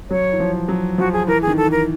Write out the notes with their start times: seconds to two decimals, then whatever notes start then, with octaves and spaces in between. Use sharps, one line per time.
0.10 F#3 C#5
0.32 E3
0.40 F3
0.69 F#3
0.98 F3 F#4
1.13 G#4
1.27 E3 A#4
1.42 G#4
1.47 D#3
1.57 A4
1.67 E3 A#4